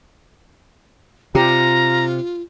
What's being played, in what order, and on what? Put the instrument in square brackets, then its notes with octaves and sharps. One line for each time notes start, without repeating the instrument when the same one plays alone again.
[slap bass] C3 [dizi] F4 [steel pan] G4 [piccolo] A#5